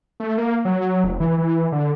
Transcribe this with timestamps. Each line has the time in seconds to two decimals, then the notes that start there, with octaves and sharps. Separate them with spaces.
0.20 A3
0.38 A#3
0.65 F#3
1.04 F1
1.20 E3
1.38 E3
1.72 D3